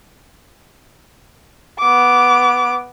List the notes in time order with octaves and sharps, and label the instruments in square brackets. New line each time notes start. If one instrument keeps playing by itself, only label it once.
[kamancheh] B3 D6